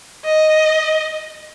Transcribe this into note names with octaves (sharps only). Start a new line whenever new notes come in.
D#5